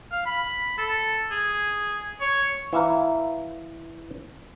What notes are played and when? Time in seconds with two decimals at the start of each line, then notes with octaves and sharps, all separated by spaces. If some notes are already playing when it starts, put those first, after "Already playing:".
0.12 F5
0.26 B5
0.78 A4
1.31 G#4
2.21 C#5
2.73 E3 E5 F5 A#5